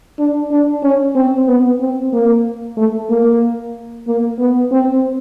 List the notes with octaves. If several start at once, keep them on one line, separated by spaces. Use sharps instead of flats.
D4
D4
C#4
C4
B3
C4
A#3
A3
A#3
A#3
B3
C4